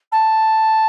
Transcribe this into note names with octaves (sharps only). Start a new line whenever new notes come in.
A5